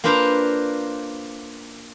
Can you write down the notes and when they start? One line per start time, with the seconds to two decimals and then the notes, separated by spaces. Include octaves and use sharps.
0.04 A#3 D4 F4 B4 C5 F5